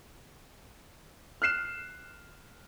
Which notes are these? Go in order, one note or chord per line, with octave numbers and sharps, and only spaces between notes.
F6 F#6 C7 E7